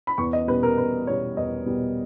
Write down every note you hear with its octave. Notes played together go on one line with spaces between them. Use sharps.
B5
E2 C#6
D#5
B2 G3 B4
A#4
E2 B4
B2 G3 C#5
E2 D#5
B2 G3